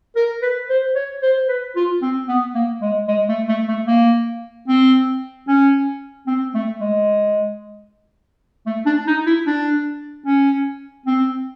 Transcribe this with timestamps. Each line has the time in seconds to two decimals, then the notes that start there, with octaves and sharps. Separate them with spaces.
0.16 A#4
0.42 B4
0.69 C5
0.95 C#5
1.22 C5
1.48 B4
1.76 F4
2.02 C4
2.28 B3
2.54 A#3
2.82 G#3
3.08 G#3
3.28 A3
3.48 A3
3.68 A3
3.87 A#3
4.68 C4
5.48 C#4
6.27 C4
6.54 A3
6.81 G#3
8.66 A3
8.86 D4
9.07 D#4
9.26 E4
9.47 D4
10.26 C#4
11.06 C4